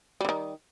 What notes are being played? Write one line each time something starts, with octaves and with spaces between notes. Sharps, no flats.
D3 D#3 G3